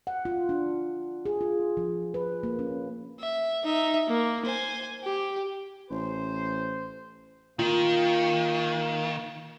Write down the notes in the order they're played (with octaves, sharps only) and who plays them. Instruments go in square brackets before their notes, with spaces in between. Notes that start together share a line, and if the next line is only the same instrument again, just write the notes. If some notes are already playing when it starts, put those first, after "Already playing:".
[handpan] F#5
F4
D4
G#4
F4
F3
B4
A#3
C#4
[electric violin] E5
D#4 E5
A#3
C5 G#5
G4
[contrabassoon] A1 [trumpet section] C5
[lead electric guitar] D#3 [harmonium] A#3 [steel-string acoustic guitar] F4